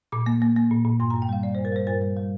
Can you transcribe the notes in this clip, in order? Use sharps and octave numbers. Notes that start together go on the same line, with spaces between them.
A#2 D6
A#3
A#3
A#3
A#2
A#2
G2 C6
A#5
G2
G5
G3 F5
G3 D5
C5
G2
A#4
G3 C5
G2 A#4
G3
G3